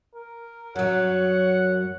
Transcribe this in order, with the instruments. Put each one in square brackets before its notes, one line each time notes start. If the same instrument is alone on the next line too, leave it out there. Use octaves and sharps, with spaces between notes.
[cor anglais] A#4
[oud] F#2 F#3 [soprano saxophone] C#5 [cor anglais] F#5